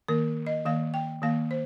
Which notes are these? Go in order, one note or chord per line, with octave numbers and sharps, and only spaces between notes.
D#3 A#3 A#4
D#5
D#3 A#3 F5
G5
D#3 A#3 F5
C5